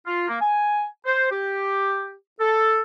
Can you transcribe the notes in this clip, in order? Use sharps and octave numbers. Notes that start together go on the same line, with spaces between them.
F4
A#3
G#5
C5
G4
A4